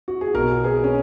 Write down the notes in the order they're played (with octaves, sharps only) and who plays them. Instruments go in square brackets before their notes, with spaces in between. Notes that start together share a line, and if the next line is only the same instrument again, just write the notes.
[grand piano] F#4
G#4
B1 B2 F#4 A#4
G#4 B4
C#4